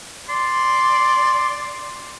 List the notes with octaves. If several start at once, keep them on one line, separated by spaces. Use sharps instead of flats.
D5 C6